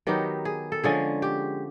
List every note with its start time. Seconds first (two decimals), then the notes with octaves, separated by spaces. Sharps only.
0.07 D#3 F#3 B3 D#4 G4
0.45 G#4
0.72 A4
0.84 D3 F3 G#3 C#4 G#4
1.22 G4